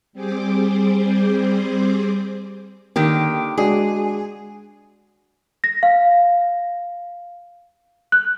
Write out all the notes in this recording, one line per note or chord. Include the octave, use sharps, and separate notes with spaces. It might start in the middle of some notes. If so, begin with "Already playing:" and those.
G3 C4 G#4 C5 D6
D3 D#3 A#3 G4
G#3 D4 F#4 G#4
A#6
F5
F#6